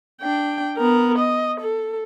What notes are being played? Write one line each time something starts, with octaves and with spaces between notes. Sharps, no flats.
D4 G5
B3 A#4
D#5
A4